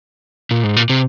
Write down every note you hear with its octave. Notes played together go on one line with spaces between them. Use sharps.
A#2
G#2
A#2
C3